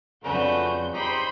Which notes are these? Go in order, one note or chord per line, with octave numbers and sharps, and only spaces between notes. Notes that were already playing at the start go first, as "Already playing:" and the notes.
F2 C#3 A3 C#4 D4 F#4 B4 G6
D#4 G4 C5 B5 G6